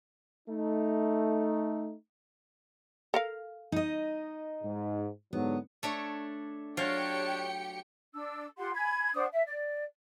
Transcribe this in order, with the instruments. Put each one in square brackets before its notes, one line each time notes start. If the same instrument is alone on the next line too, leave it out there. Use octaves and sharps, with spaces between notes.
[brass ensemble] A3 D#4
[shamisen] A4 A#4 F5
[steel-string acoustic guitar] D#4 D#5
[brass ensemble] G#2
[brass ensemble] G#2 D3 F#3 [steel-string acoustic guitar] B3
[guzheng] A3 D4 C#5
[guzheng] F#3 F4 F5 [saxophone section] D4 C#5 [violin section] G4 G5 C#7
[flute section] D4 E6
F4 G4 F#5 C6
G#5 B5 G#6
D4 C5 F#5 D#6
E5
D5